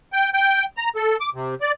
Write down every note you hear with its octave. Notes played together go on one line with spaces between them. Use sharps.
G5
G5
A#5
A4
D6
C3
D5